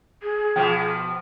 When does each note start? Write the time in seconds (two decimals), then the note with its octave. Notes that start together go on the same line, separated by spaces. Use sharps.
0.23 G#4
0.56 B2 F3 G5